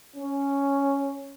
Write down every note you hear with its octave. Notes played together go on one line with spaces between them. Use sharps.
C#4